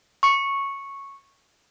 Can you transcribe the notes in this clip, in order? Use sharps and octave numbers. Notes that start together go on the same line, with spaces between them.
C#6 C#7